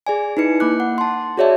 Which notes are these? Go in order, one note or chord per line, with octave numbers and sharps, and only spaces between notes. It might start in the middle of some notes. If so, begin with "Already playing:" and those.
G#4 D5 G#5
D#4 E4 B4 C#7
A#3 D6 F#6
F#5
A5 C6
F#4 G#4 C#5 D5 E5 A5